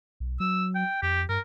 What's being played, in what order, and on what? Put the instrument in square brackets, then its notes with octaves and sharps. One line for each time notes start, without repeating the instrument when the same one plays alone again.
[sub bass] B1
[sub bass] F#3 [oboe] E6
[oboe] G5
[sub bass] F2 [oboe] G4
[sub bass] G2 [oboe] A#4